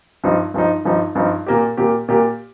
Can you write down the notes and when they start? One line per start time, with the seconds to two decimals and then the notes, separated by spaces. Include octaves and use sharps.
0.24 G2 F3 D#4
0.54 G2 F3 D#4
0.85 G2 F3 D#4
1.15 G2 F3 D#4
1.46 A#2 A#3 G4
1.77 A#2 A#3 G4
2.08 A#2 A#3 G4